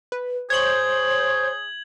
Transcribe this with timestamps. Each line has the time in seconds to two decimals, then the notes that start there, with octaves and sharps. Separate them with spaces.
0.12 B4
0.50 G#4 C5 C#5 G6 G#6 F#7